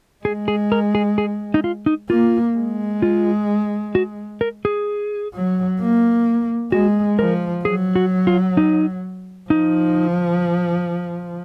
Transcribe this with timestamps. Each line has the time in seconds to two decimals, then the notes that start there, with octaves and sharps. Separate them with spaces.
0.25 G#3 G#4
0.48 G#4
0.72 A#4
0.95 G#4
1.18 G#4
1.54 D#4
1.64 F4
1.86 D#4
2.09 A#3 F4
2.57 G#3
3.02 F4
3.95 F#4
4.41 A#4
4.65 G#4
5.34 F#3
5.81 A#3
6.72 G#3 F#4
7.19 F3 A#4
7.65 F#3 G#4
7.95 F#4
8.27 F4
8.57 D#4
9.50 F3 D#4